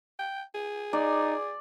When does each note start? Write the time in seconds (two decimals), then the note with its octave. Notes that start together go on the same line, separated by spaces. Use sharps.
0.19 G5
0.55 G#4
0.93 D#4 D5